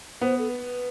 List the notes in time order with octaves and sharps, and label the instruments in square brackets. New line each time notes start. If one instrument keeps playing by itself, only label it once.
[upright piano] B3 [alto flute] C5
[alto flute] A4
B4